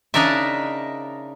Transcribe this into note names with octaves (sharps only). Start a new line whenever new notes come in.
C#3 D4 D#4 A#4 D5 E5